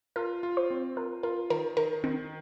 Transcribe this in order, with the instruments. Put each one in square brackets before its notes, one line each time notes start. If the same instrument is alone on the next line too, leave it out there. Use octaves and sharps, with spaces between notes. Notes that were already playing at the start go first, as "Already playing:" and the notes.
[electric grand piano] F4 [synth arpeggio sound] A#4
[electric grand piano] F4
[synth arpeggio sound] C5
[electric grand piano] C4
[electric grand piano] F4 [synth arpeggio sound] A#4
[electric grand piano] F4 [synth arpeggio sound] A#4
[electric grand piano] D#3 [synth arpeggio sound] A#4
[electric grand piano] D#3 [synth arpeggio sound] A#4
[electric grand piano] D#3 [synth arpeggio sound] C4